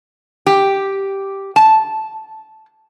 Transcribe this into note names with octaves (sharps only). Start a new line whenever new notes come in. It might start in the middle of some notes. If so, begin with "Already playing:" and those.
G4
A5